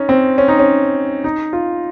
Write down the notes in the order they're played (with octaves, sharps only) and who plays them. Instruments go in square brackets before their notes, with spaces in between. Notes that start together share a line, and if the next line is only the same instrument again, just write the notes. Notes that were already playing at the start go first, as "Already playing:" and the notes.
Already playing: [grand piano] C#4 D#4
C4
C#4
D#4
C#4
D#4
F4